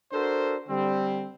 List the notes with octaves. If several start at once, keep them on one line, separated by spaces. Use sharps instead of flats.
D4 F#4 A4 A#4 C5
D3 G3 C4